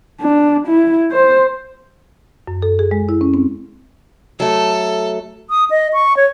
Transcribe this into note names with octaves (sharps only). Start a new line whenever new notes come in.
D4
E4
C5
F#2
A4
G#4
G#3
E4
C#4
C4
F#3 A3 A4
D#6
D#5
C#6
C#5